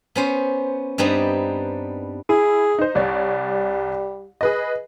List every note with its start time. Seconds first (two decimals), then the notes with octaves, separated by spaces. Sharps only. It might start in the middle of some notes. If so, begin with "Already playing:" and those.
0.16 B3 C#4 C5
0.98 G2 G3 B3 C4 D#4
2.29 E4 G#4
2.79 D#4 C5
2.95 C2 G3 C#5 D5
4.41 G#4 B4 D#5